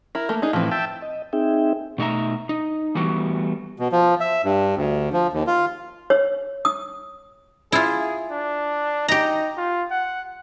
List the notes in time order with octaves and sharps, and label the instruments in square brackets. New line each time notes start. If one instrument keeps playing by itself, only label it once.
[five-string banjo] E4 [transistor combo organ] A#4
[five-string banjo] A3 A#3
[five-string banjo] D4 D#4 [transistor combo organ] G#4
[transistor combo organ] A2 E3 [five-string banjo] F3 C4
[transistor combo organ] E5 G5 A5
[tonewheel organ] D#5
C4 D#4 G#4 E5 G5
[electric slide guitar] B2 A3 D#4 E4 E5 A#5
D#4
E3 G3 A3 B3 F#4
[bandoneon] B2
F3
E5
G2
D2
F3
D#2
F4
[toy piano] C#5
D#6
[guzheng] E4 F4 [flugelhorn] G#4
[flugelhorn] D4
[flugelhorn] D#4 [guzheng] G4 A#5
[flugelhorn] F4
F#5